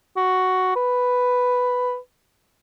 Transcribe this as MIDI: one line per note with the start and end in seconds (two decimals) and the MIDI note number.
0.17 0.74 66
0.76 1.97 71